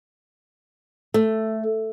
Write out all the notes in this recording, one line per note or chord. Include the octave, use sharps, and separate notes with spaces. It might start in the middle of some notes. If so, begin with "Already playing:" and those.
A3